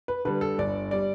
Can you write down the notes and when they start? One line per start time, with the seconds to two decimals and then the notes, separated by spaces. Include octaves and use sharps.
0.08 B4
0.25 D3 G3 B4
0.41 A4
0.58 G1 D5
0.91 G3 D5